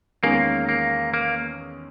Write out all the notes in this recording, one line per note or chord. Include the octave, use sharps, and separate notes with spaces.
E2 D#3 G#3 A#3 C#4 G#4
A#3
A#3